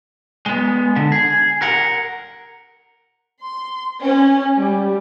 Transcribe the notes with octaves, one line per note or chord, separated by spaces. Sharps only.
G#3 B3
D3
G#4
A#4 F#5
C6
C#4
G3